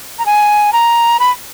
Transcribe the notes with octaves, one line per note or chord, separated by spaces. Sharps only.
A#5
G#5
A#5
B5